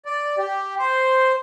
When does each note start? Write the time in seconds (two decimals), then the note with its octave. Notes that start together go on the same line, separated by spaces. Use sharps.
0.06 D5
0.38 G4
0.79 C5